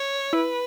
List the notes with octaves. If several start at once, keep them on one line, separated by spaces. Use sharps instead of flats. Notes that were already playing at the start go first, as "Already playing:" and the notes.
Already playing: C#5
E4 B4